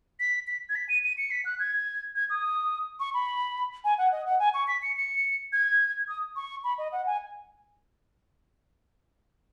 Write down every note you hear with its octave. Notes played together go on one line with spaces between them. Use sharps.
B6
B6
G#6
B6
D#7
D#7
C#7
B6
F#6
G#6
G#6
D#6
C#6
B5
G#5
F#5
D#5
F#5
G#5
C#6
B6
C#7
C#7
G#6
D#6
C#6
B5
D#5
F#5
G#5